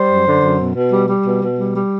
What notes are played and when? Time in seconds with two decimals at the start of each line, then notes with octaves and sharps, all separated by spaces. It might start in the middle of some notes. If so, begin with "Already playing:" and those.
Already playing: G3 C5
0.09 F#2
0.25 D3
0.42 F#2
0.59 B2
0.75 B2
0.92 G3
1.09 G3
1.26 B2
1.43 B2
1.59 G3
1.76 G3